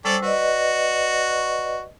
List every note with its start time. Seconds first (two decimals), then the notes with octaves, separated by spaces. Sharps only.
0.05 G3 C#4 A4 C5 D5 E6
0.23 F#4 B4 D5 D#5